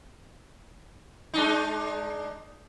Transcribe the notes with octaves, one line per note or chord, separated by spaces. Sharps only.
G#3 D4 D#4